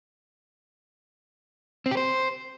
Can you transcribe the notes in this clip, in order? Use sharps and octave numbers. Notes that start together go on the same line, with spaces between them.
C4
G4
C5